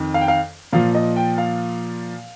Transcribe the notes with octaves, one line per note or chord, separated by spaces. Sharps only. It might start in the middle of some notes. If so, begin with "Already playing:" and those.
Already playing: F2 D#3
F5
G5
F5
A#2 F3 F5
D#5
G5
F5